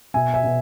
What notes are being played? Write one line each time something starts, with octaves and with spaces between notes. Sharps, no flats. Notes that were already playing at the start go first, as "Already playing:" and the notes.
B2 E5 G#5
E5 G#5
B2